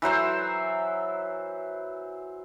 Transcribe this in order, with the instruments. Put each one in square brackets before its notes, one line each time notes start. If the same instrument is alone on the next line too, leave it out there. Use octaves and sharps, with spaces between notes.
[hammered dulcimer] E3 F#3 C5 E5